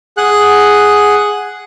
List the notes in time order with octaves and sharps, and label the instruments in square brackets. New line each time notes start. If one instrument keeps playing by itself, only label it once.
[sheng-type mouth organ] G#4 F#5 F#6